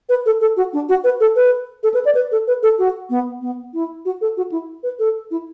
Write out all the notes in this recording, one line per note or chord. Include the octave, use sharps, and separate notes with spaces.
B4
A4
A4
F#4
D4
F#4
B4
A4
B4
A4
B4
D5
B4
A4
B4
A4
F#4
B3
B3
E4
F#4
A4
F#4
E4
B4
A4
E4